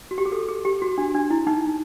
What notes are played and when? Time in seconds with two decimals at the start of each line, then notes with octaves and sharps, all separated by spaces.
0.11 F#4
0.18 G4
0.26 G#4
0.32 A4
0.48 G#4
0.65 G4
0.82 F#4
0.98 D4
1.14 D4
1.30 E4
1.47 D#4